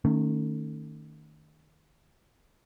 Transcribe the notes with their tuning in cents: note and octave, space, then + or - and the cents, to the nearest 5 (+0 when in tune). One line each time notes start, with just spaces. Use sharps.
D#3 -15 A3 +30 C#4 +0